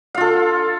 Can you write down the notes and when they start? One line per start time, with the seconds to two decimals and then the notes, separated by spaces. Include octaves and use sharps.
0.14 F5
0.18 F4
0.21 A4